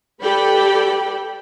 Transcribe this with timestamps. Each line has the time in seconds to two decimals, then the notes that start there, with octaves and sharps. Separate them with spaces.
0.22 G4 A4 B4 D5 G5 B5